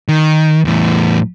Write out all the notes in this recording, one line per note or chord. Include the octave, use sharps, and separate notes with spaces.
D#3
E2 A2